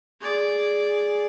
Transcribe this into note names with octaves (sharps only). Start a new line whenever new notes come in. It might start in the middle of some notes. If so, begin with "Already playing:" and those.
G#4 D5